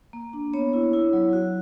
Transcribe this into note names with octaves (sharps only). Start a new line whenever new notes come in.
A#3
D4
B3 C#5
E4
E4
F#3
F#4